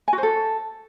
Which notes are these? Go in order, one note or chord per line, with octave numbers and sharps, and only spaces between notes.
G#5
F#4
C5
A4